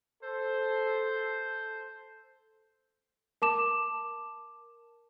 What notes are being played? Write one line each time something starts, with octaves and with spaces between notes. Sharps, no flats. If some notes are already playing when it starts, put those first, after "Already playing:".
A4 C5
A#4 A5 D6 E7